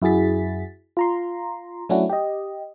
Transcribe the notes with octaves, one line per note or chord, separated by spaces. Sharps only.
F#2 E4 F#4 G#4 A6 B6
F4 A#5 C6
F#3 A3 C#4 D4 E4 F#4
G4 D#5